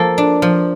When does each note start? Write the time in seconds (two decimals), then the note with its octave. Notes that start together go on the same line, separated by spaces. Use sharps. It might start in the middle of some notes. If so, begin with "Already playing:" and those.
Already playing: F3 A#3 A4
0.18 D4
0.42 F3